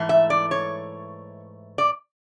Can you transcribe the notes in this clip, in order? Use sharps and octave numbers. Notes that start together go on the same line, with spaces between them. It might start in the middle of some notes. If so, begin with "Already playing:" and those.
Already playing: G#2 E3 A3
E5
D5
C#5
D5